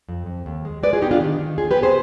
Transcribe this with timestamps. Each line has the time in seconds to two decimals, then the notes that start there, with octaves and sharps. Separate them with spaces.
0.08 F2
0.26 F2
0.46 D#2
0.65 G#3
0.83 G#3 B4 D5
0.93 F4 G#4
1.01 B3 D#4 G4
1.11 D4 F4
1.20 D#3
1.39 D#3
1.58 D#2 F4 G#4
1.71 G4 B4
1.77 B3
1.83 G#4 C5